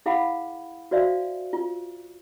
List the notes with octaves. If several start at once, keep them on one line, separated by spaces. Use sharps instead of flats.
E4 G#4 F5 F#5 B5
F#4 C5 D5 E5 F5
F4